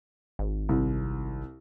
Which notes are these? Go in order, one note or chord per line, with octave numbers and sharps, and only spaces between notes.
G#1
C2